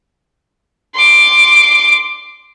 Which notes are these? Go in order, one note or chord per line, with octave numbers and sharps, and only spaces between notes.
C6 D6